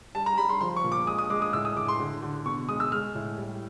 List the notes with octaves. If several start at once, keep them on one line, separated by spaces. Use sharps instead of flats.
G3 A5
A#5
G3 B5
C6
F3 C6
C#6
A#2
D6
G#3 D#6
D#6
G#3 D6
D#6
A2 E6
D#6
A2 D6
C6
D3
D3
B2 C#6
G#3 D#6
E6
G#3 F6
A2
G3